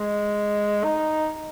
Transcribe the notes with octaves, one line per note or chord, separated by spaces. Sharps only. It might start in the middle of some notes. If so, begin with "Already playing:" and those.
Already playing: G#3
D#4